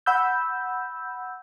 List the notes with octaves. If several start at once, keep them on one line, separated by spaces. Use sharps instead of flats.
F#5 B5 E6 G6